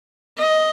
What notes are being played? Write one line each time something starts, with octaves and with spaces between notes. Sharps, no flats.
D#5